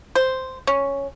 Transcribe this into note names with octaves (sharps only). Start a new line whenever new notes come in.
C5
C#4